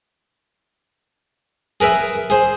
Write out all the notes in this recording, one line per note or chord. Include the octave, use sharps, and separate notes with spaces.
G#4 A#4 B4 E5
G#4 C5